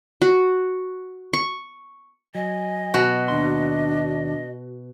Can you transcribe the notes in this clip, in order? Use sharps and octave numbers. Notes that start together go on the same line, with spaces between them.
F#4
C#6
F#3 D#5 G#5
B2 F#4
D#2 G#2 D4 C6